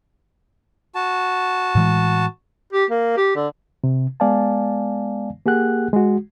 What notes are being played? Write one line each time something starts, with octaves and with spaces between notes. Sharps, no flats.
F#4 A5
A2 E3 G#3
G4
A#3
G4
D3
C3
G#3 B3 D5 F5 G#5 A5
A#3 G4 G#4 F#5 F#6
G#3 F#4